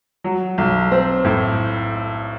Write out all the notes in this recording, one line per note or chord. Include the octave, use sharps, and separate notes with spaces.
F#3
B1
C4
A2